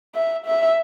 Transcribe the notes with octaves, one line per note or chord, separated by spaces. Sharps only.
E5
E5